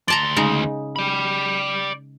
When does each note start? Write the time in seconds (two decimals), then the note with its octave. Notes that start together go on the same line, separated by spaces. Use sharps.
0.08 D2 D5 A5 A#5 C6
0.36 C#3 G#3 D#4
0.96 D5 B5